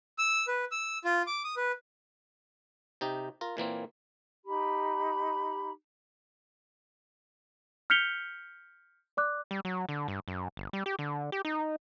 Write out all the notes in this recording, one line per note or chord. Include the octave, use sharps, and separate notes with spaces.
E6
B4
E6
F4
D6
D#6
B4
C3 D#4 G4
F4 A#4
A#2 E3 A#3 C4
D#4 G4 B5
F6 G6 B6 C#7 F7 G7
D5 D6 F#6
G3
F#3
D3
G2
F#2
G1
G3
G4
D3
G4
D#4